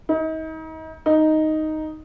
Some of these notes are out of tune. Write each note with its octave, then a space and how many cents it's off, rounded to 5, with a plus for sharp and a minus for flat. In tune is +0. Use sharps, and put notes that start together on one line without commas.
D#4 +35
D#4 +0